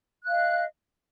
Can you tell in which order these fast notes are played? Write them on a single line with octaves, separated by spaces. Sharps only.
F#6 F5 D#5